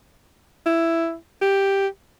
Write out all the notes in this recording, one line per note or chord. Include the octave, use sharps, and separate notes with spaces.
E4
G4